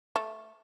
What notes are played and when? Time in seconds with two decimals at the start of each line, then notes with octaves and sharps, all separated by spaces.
0.16 A3